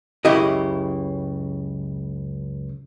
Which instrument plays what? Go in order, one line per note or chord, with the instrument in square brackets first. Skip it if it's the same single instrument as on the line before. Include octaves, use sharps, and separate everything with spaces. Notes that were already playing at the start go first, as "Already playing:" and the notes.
[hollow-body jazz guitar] C#2 F#2 C#3 E4 G4 D#5